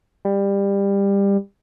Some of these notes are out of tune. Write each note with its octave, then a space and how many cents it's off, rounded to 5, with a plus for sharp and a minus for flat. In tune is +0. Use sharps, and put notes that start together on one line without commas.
G3 +20